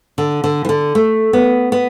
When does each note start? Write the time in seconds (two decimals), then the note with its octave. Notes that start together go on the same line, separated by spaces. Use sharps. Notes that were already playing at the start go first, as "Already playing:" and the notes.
0.18 D3
0.44 D3
0.65 E3
0.69 D3
0.95 A3
1.33 B3
1.72 B3